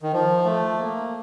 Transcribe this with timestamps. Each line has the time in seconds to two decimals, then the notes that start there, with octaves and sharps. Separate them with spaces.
0.02 D#3
0.13 F3
0.45 A3
0.79 A#3